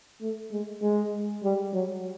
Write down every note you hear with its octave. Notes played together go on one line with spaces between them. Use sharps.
A3
G#3
G#3
G3
F#3